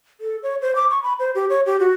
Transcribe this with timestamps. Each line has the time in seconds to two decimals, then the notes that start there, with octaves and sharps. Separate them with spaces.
0.21 A4
0.43 C#5
0.62 C5
0.75 D6
0.90 C#6
1.03 B5
1.19 C5
1.35 G4
1.49 C#5
1.66 G4
1.80 F#4